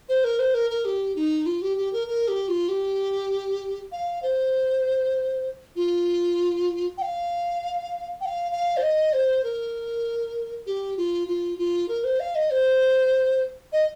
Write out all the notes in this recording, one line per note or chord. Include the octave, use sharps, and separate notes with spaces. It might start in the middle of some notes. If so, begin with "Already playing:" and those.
C5
A#4
C5
A#4
A#4
G4
D#4
F4
G4
G4
A#4
A#4
G4
F4
G4
F5
C5
F4
G5
F5
G5
F5
F5
C5
D#5
C5
A#4
G4
F4
F4
F4
A#4
C5
F5
D#5
C5
D#5